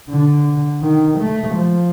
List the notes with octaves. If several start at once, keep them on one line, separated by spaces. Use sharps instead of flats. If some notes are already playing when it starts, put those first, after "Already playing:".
D3
D#3
A3
F3